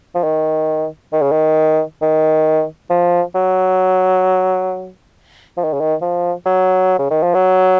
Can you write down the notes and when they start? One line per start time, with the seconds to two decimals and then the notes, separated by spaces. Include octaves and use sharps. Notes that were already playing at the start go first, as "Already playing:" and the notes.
0.15 F3
0.23 D#3
1.13 D#3
1.22 C#3
1.31 D#3
2.02 D#3
2.90 F3
3.35 F#3
5.57 F3
5.64 D#3
5.73 C#3
5.80 D#3
6.02 F3
6.46 F#3
6.99 C#3
7.10 D#3
7.23 F3
7.34 F#3